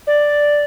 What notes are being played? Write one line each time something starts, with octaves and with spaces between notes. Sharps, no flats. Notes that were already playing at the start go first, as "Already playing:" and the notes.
D5